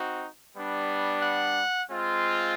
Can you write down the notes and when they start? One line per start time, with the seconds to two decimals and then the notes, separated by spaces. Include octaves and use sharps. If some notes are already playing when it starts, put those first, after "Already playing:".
Already playing: C4 D#4 F#4
0.54 G3 B3 D4
1.21 F#5
1.90 G#3 C4 F4